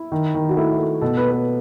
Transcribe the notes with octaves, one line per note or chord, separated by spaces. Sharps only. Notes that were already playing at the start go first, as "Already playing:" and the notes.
Already playing: E4
D#3
D#3
F#4
A3 E4
E4
A3
B2 A4
B4
B3
B4